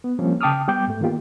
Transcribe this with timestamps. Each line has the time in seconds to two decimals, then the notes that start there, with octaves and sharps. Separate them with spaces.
0.04 B3
0.19 F3 G3 A#3 C4 C#4
0.41 C#3 G5 A5 D6 D#6 F6
0.68 G3 B3 G5 D6 G6
0.88 G#2 A3
1.01 D#3 A#3 B3 F4 G4